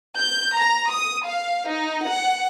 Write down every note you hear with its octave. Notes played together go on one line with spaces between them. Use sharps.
G6
A#5
D#6
F5
D#4
F#5